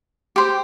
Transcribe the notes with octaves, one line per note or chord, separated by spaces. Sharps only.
G4 C5